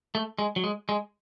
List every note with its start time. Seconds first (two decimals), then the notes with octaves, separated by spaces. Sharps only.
0.15 A3
0.39 G#3
0.56 F#3
0.64 G#3
0.89 G#3